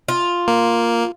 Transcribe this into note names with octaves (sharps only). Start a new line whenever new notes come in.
F4
A#3